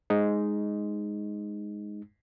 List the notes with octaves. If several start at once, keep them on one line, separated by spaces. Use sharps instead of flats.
G#3 D#4